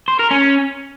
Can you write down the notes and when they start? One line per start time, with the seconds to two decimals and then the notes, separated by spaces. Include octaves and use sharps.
0.08 C5
0.19 A#4
0.31 C#4